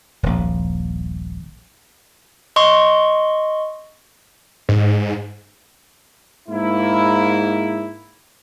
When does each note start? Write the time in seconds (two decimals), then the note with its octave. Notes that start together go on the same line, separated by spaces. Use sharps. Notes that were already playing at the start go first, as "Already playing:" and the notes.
0.23 D#1 A#1
2.56 D#5 C6 C#6
4.69 G#2
6.48 G#2 A#3 E4